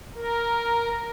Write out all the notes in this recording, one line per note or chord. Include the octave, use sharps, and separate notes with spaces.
A#4